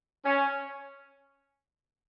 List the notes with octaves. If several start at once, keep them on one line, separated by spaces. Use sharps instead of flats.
C#4